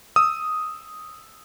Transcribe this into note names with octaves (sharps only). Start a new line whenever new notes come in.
D#6 E6